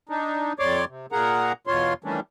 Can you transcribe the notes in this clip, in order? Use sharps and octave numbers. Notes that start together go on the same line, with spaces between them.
D4 D#4
F2 C#5 D5 C6 D6
C3
A#2 A#3 G#4 A#4 F#5 A#5
E2 B2 F4 C#5 C6
D#3 E3 G3 A3 C#4 D4